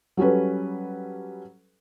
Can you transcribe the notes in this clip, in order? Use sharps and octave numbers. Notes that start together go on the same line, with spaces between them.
F#3 G3 C#4 A4 B4